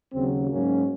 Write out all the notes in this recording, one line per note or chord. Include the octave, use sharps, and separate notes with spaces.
D#2 C#3 F#3 C4
G#2 F#3 A#3 C#4